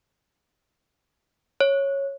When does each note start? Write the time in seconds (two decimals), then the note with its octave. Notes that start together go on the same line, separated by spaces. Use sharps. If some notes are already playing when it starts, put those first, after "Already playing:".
1.61 C#5